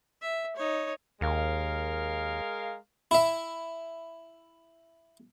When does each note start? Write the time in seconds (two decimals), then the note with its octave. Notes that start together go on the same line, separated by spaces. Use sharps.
0.22 E5
0.56 D#4 C#5
1.21 D#2 G#3 A#4 F5
3.11 E4 E5